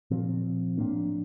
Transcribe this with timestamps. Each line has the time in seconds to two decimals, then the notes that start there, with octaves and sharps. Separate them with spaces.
0.10 A#2 F3 C4
0.78 A2 F3 A#3 D4